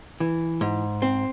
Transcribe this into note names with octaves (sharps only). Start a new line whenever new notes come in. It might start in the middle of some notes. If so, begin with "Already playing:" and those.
E3
G#2
C4